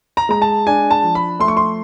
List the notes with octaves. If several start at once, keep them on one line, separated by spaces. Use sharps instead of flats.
A#5
G#3 A#5
A5
D4 G#5
A5
F3
B5
A3 C6
C#6
C6